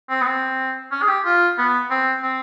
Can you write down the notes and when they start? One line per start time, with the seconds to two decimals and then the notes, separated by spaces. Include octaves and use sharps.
0.09 C4
0.21 B3
0.26 C4
0.91 C#4
1.02 G#4
1.08 G4
1.25 F4
1.58 B3
1.90 C4
2.23 C4